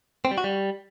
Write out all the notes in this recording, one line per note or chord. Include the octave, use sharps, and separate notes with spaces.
C4
G3
F#4
G3